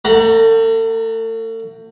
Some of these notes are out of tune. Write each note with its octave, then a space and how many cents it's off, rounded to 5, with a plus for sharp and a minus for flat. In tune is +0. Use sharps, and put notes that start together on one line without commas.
A3 +40 F#5 +0 A#5 +0